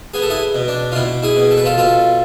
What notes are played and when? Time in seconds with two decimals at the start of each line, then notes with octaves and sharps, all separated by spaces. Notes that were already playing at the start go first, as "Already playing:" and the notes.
0.14 B3 G#4
0.22 A4
0.30 E4 G#4
0.55 B2
0.68 D4
0.92 F4
0.95 B2 E4
1.23 E4 G#4
1.36 B2
1.51 A4
1.58 B4
1.65 F4 A4
1.77 B2 F4 A4